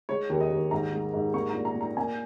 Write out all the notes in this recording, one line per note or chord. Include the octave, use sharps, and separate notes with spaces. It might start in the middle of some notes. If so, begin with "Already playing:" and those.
G#3 C#5
D#2
D#5
D#2
G#2 A#5
G#3
G#2
A#3 C#6
A#2 A#5
A#5
A#2
A#5
A#3 G#5